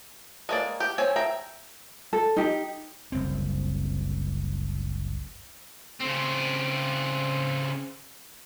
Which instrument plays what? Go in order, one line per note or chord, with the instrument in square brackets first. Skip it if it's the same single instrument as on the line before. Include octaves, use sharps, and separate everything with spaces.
[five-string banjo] G#3 A#3 D5
G4
C4 C#5 G#5
E5 G5 A#5
[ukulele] A4
D#4 G4
[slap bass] F#1 C2 C4
[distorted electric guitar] C#3 C4